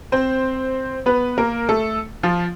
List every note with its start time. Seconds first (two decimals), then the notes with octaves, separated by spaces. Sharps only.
0.12 C4 C5
1.06 B3 B4
1.38 A#3 A#4
1.69 A3 A4
2.23 F3 F4